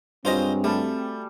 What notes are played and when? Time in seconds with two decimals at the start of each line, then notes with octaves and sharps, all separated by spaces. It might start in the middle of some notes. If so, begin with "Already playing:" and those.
0.25 G2 F#3 G#3 C4 F4 C5 D#5 F5
0.64 G3 A3 A5